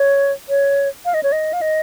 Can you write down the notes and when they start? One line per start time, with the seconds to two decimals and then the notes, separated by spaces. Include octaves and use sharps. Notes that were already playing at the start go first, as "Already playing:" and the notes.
Already playing: C#5
0.49 C#5
1.05 F5
1.14 D#5
1.23 C#5
1.32 D#5
1.53 F5
1.61 D#5